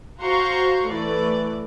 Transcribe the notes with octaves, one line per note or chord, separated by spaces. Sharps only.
F#4 C5 F5 A#5 C6 C#6
E3 A3 D5